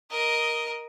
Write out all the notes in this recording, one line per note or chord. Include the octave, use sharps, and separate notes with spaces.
A#4 D#5